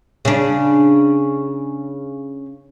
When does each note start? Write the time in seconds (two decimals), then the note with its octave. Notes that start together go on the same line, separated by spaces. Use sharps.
0.25 C#3 D4